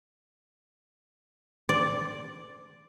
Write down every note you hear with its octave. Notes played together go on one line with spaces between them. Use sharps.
D5